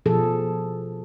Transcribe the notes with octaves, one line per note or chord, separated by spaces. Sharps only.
B2 F3 G#4 A4